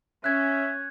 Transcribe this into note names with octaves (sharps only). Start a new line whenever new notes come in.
C#4 E5 F#6 G#6